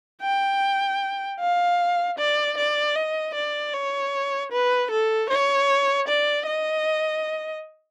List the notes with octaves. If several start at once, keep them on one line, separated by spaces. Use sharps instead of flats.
G5
F5
D5
D5
D#5
D5
C#5
B4
A4
C#5
D5
D#5